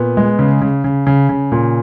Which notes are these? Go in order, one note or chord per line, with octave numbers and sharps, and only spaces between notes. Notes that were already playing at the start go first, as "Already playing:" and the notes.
Already playing: A#2 B3
G#3
C#3
C#3
C#3
C#3
C#3
A#2